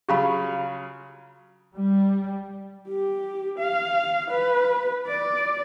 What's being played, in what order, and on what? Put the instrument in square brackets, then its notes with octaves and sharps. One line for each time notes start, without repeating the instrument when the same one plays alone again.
[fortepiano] C#3 F#3 F4 [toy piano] G4 F5 B5
[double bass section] G3
[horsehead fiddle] G4
F5
B4
D5